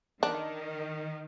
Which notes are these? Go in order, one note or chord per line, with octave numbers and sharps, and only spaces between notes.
D#3 D4